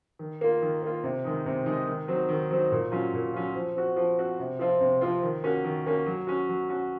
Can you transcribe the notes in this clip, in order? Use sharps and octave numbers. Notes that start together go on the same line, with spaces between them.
D#3
A#3 F4
D#3
A#3 F4
C3
D#3 G#3 D#4
C3
D#3 G#3 D#4
D#3
F#3 C4 D#4
D#3
F#3 C4 D#4
A#2
F#3 C#4 F4
A#2
F#3 C#4 F4
F3
C4 F#4
F3
C4 F#4
C3
F3 C4 F4
C3
F3 C4 F4
D#3
A#3 C#4 F#4
D#3
A#3 C#4 F#4
F#3
C#4 F#4
F#3
C#4 F#4